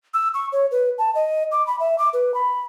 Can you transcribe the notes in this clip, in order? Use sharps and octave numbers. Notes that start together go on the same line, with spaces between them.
E6
C#6
C#5
B4
A5
D#5
D6
B5
E5
D6
B4
B5